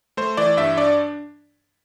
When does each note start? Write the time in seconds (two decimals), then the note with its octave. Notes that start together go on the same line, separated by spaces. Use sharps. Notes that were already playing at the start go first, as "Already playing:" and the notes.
0.17 A3 C5
0.37 E3 D5
0.57 G2 E5
0.77 D4 D5